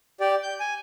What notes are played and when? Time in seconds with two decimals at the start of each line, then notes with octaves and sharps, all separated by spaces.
0.20 G4 D5
0.43 G6
0.60 G#5